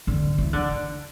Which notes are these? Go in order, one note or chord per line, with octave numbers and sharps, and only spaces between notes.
D3
E3
D3